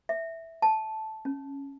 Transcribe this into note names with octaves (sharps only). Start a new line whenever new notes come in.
E5
A5
C#4